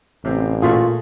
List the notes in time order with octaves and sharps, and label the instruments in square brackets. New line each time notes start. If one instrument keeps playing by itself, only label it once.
[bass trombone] A1 [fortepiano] C3 C4
[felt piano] A#2 [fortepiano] A3 F#4 G#4 [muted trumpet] F4